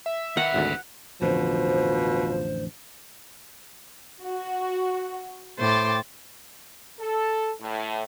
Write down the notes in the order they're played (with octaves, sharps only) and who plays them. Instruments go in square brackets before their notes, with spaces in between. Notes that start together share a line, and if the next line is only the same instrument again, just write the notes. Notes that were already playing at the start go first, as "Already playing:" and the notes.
[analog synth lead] E5
[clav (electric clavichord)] D#3 [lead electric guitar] D#4 B4 [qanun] F#5
[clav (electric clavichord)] G#1 D2
[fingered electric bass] A1 F2 D3 [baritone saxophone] B2 [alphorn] F3 [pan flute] C5
[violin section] F#4
[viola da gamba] A2 C5 [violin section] G5 D6 A6
[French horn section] A4
A2